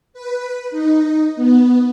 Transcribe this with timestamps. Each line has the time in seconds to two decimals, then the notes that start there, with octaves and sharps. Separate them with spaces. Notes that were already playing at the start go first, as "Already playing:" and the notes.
0.13 B4
0.71 D#4
1.36 B3